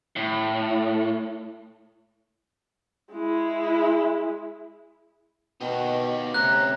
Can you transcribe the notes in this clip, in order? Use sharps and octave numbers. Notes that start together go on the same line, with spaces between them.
A2
G#3 E4
B2 D#4 G4
D2 C3 C#4 A#5 F#6